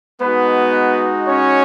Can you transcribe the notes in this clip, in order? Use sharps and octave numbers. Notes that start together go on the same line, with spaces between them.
G#3 B3 D#4 F#4 B4
C#4 C#5